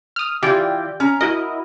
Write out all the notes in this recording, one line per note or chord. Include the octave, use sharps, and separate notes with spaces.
D#6 F6
E3 F4 G4 D5 G5
C#4 A#5
E4 F#4 A#4 D#5